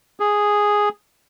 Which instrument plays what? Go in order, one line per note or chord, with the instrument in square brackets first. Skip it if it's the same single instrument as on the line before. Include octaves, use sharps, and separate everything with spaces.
[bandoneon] G#4